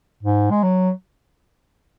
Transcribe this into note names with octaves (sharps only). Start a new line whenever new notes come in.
G#2
G#3
F#3